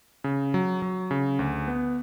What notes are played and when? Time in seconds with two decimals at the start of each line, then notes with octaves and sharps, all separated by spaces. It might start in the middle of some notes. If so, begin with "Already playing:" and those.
0.24 C#3
0.54 F#3
0.82 F#3
1.11 C#3
1.39 D2
1.68 B3